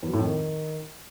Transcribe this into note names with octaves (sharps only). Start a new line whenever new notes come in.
E2
F#3
A2
F2
D#3